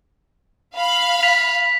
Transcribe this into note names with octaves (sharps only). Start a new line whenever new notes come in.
F5 B5
B6 F7